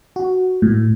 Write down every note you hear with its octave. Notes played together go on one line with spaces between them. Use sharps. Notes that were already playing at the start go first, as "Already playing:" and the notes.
F#4
A2